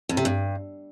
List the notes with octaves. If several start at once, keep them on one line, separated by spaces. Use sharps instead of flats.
F2
C3
G2